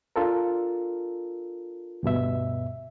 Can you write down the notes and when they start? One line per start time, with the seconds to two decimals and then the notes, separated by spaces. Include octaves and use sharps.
0.16 D4 F4 A4 A#4
2.03 D2 G2 B2 E5